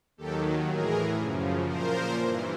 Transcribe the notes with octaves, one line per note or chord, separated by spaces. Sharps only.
D#2 D#3 F#3 G4 A4
A2 E3 G#4 A#4
F#2 C#3 F3
A#2 F3 A#4 C5
G2 E3